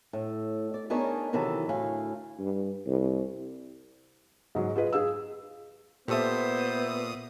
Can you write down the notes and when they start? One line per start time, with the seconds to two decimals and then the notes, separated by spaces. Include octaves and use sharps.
0.13 A2
0.74 D5
0.90 B3 D4 D#4 G#4 A#4 C#5
1.33 C3 D#3 E3 F#3 A4
1.69 D2 A2 F5 G#5
2.39 G2
2.87 C2
4.55 G#2 F#3
4.76 F4 G#4 B4 D#5
4.93 G#4 F5 E6
6.08 A#2 B3 G4 A4 C5 E5 D#6